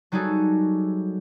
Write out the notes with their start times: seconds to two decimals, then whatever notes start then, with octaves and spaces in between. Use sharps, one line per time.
0.12 F#3 G3 D#4 F#4 G#4 A4